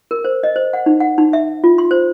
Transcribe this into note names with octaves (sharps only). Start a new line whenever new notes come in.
A#4
C5
D#5
C5
F#5
D#4
F#5
D#4
E5
F4
C6
C5